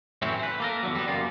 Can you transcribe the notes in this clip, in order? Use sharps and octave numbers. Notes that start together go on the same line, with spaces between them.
A2 E3 F#3 C4 C#4 E4
B4 C5
A#3 A4 A#4
E2 D3 F#3
G3 B3
F#2 C#3 A#3 F4